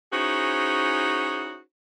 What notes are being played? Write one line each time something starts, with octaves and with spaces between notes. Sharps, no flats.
C#4 D#4 E4 F#4 G#4 C5